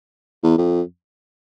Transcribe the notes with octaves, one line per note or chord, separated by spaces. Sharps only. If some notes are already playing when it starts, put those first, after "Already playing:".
E2
F2